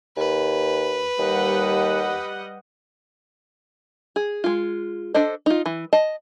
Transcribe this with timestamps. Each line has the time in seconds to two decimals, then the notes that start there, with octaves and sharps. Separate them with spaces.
0.17 D#2 B4
1.19 D#2 G3 D#5 F#5
4.16 G#4
4.44 G#3 F4
5.14 D4 A4 C5 D#5
5.46 D#4 F4
5.66 E3
5.93 D#5 A5